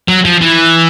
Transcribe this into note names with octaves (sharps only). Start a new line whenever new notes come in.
F#3
F3
E3